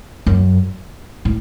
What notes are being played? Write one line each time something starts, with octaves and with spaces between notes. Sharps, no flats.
F#2
A2